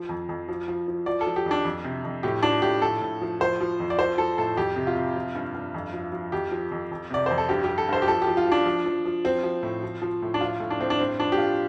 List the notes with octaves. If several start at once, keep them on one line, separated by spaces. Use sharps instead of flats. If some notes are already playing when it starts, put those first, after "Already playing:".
Already playing: F3
F2
F2
F3
F3
F3
F3 D5
A4
F3
G4
F2 D4
F2
C3
F2
A2 G4
F3 D4
A2 G4
A2 A4
A2
F3
F3 C5
F3
F2
D5
F3 C5
F3 A4
A2 A4
F2 G4
C3
F4
C3
F3
G2
G2
F2
F3
F3
F2 G4
F3
F2
F2
C3 D5
F2 C5
A4
G2 G4
G4
G2
A4
G2 C5
G4
F3 A4
G4
F3
F4
F3 D4
F3
F3
F3
F3 C4
F3
A2
F3
F3
A2
D4
F3 F4
A2
D4
A2 C4
D4
G2 C4
F3 D4
G4
F3 F4